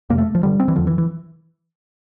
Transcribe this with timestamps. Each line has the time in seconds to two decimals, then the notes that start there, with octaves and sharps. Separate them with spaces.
0.10 F2 C3 A#3
0.18 A3
0.35 F3
0.43 G2 D3 G3
0.60 C4
0.68 E3
0.76 E2 D3 F3
0.87 E3
0.98 E3